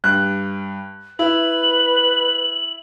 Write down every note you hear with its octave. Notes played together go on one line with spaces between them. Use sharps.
G2 F#6
E4 B4 F#7